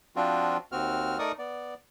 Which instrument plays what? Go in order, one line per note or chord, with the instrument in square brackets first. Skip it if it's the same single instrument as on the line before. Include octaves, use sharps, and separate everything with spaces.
[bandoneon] F3 C4 D4 F4 F#4
D#2 C4 F#4 F6
A3 D#4 A#4 D5 C#6 D#6
B3 D5